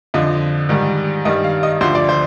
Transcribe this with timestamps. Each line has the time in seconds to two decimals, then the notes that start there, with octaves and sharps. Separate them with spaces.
0.14 F2 D3 F3 D#5
0.69 G#2 D#3 G3
1.25 G2 D#3 G3 D#5
1.44 F5
1.63 D#5
1.81 D2 D3 F3 C5
1.95 D5
2.09 C5